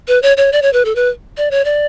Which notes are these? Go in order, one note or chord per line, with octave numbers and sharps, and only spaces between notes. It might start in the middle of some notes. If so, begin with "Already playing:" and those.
B4
C#5
C#5
D5
C#5
B4
A4
B4
D5
C#5
D5